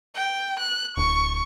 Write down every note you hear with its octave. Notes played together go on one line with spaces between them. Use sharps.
G5
F#6
D1 C#6